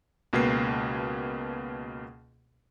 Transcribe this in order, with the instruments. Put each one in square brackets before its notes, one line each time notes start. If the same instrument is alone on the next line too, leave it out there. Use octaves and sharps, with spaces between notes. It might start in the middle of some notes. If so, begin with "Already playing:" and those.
[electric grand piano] C#2 B2 A#3 B4 C7